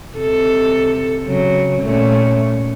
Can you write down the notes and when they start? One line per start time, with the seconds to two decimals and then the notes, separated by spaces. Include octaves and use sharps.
0.16 C3 A4
1.24 C#3 F#3
1.83 A#2 A3 C#4